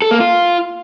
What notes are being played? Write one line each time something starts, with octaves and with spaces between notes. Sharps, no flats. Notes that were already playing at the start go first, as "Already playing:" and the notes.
A4
A#3
F4